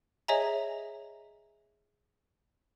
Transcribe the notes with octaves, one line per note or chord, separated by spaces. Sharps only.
G#4 C#5 D#5 E5 G#5 A#5